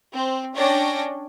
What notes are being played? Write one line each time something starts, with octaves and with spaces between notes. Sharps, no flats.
C4
C#4 D4 C#5 D5 G5 A#6